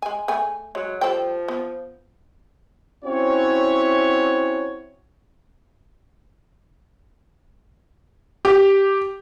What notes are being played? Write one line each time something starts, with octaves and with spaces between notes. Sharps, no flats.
G#3 G#5
A3 G#4 G#5
F#3 G#3
F3 G3 A4 G5
B3
C4 C#4 E4 F#4 C#5
G4